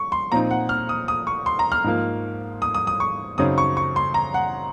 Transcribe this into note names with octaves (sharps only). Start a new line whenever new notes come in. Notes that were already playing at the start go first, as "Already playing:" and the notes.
Already playing: C#6
C6
A#2 F3 C4 D#4 A#5
F#5
F6
D#6
D#6
C#6
C6
A#5
F6
G#2 F3 A#3
D#6
D#6
D#6
C#6
F#2 C#3 F#3 C4 D#4 D#6
C#6
C#6
C6
A#5
F#5